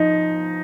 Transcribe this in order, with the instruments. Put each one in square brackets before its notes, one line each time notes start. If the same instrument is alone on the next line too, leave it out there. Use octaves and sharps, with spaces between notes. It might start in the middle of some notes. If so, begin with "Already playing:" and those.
Already playing: [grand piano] F3 D#4